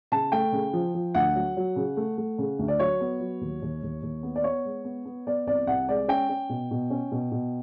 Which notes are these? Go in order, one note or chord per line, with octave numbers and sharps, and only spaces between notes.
C#3 A5
A3 G5
C#3
F3
F3
D2 F#5
F#3
F#3
C#3
A3
A3
C#3
D2
D5
F#3 C#5
B3
F#3
D#2
D#2
D#2
D#2
B3
D5
B3 C#5
G#3
B3
B3
B3 D5
C2 D5
C2 F#5
G#3 D5
C#4 G5
C#4
B2
B2
C#4
B2
B2